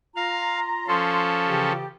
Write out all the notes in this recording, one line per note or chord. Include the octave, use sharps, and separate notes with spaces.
F4 F5 A#5
F3 C#4 A4 C6
C#3 E3 G4